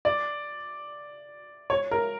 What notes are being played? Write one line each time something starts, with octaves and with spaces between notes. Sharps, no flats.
D5
C#5
A#4